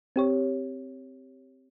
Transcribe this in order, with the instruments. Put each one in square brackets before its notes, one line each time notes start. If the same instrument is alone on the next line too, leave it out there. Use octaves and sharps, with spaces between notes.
[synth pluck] C4 G4 C#5